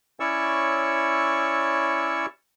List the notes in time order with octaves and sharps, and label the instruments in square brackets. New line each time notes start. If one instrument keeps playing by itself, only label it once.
[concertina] C#4 E4 C#5 D5 C#6 E6